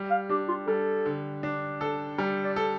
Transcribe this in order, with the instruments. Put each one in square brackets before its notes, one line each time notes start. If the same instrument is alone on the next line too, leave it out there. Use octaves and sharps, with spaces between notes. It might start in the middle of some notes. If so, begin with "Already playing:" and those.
Already playing: [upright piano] G3
[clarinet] F5
[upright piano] D4 [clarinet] G4
[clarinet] F4
[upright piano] G3 [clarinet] A4
[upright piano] D3
D4
A4
G3
[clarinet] D5
[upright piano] A4